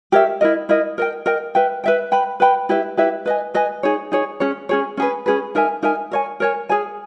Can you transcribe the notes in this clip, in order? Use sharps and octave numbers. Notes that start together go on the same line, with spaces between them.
G4 A#4 C#5 E5
E4 A#4 D#5
E4 A#4 D#5
A#4 D#5 G5
A#4 D#5 G5
B4 E5 G5
B4 E5 G5
B4 G5 B5
B4 G5 B5
E4 G4 B4 E5
E4 G4 B4 E5
B4 D#5 G#5
B4 D#5 G#5
D#4 G#4 C#5
D#4 G#4 C#5
C#4 G#4 C#5
C#4 G#4 C#5
C#4 G#4 B4
C#4 G#4 B4
D#4 A#4 E5 G#5
D#4 A#4 E5 G#5
A#4 C#5 G#5
A#4 C#5 G#5
G#4 C#5 G#5